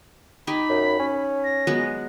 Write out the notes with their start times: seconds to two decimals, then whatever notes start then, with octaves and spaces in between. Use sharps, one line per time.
0.47 D#4 G4 G#5 B5
0.70 F#2
1.00 C#4
1.44 A#6
1.67 F#3 G#3 B3